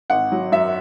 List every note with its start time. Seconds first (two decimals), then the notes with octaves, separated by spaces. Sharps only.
0.10 G#1 F#5
0.32 F#3
0.52 F#2 E5